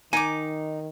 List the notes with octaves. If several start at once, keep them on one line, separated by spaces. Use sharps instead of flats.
D#3 D#4 G#5 D6